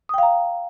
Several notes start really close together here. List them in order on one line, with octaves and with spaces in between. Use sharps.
D#6 G5 F5 A#5